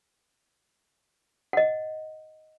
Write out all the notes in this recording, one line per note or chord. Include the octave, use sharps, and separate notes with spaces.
D#5 F#5